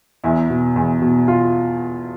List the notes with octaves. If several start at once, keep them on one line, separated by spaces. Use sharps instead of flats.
E2 E4
B2
E2
B2
F4